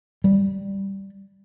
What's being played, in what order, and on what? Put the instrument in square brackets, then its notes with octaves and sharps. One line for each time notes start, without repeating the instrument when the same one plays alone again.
[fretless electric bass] G3